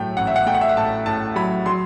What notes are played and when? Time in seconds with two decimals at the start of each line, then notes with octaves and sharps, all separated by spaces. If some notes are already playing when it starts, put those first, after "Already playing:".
Already playing: A2 F#3 A3 G5
0.17 A1 F#5
0.27 E5
0.36 F#5
0.46 A3 G5
0.55 F#5
0.61 E5
0.69 F#5
0.77 A2 A5
1.06 A2 A5
1.36 F#3 B5
1.66 F#3 C6